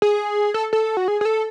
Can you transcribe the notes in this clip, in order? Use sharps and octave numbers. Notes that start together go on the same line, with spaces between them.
G#4
A4
A4
F#4
G#4
G#4
A4